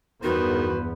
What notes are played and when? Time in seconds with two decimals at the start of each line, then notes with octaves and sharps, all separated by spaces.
0.23 E2 G2 D#3 B3 F#4 B4 C5